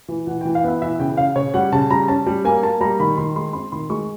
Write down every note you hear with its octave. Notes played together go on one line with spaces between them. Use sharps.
E3
E3 F#5
E3 G5
F5
B3 E5
E3 E5
C#3 G5
C#3 F5
C#3 C#5
G3 F#5
C#3 A5
G3 A#5
C#4 A5
G3
A#3 G#5
A#3 A5
G3 A#5
D#3 B5
D#3 C6
G#3 C6
C4 C6
D#3 C6
G#3 C#6